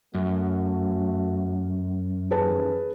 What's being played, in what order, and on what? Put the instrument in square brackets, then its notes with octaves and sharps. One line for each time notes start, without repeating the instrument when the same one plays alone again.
[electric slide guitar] F#2 [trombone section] A3 F#4
[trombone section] D#2 E3 C#4 [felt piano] G#4 B4 A5